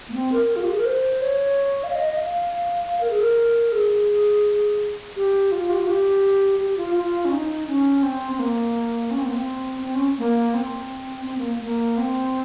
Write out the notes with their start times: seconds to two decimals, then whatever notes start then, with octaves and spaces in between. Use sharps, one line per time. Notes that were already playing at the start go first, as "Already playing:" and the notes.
0.09 A#3
0.14 C4
0.32 A#4
0.56 F4
0.63 G4
0.70 G#4
0.78 A#4
0.85 C5
1.21 C#5
1.83 F5
1.93 D#5
2.05 D#5
2.16 F5
3.01 A#4
3.10 G#4
3.20 A#4
3.72 G#4
5.16 G4
5.52 F4
5.70 G4
5.79 F4
5.87 G4
6.59 G4
6.77 F4
6.95 F4
7.25 C#4
7.31 D#4
7.67 C#4
8.03 C4
8.32 C4
8.39 A#3
9.11 C#4
9.18 C4
9.26 A#3
9.34 C4
9.82 C4
9.95 C#4
10.18 A#3
10.54 C4
11.26 C4
11.37 A#3
11.61 A#3
11.98 C4